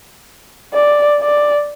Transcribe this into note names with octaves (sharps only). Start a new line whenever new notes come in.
D5
D5